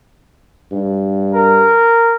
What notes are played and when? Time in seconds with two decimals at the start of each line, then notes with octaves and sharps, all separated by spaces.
0.72 G2
1.34 A#4